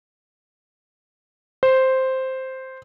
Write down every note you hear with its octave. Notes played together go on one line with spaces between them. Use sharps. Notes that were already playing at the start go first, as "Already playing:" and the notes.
C5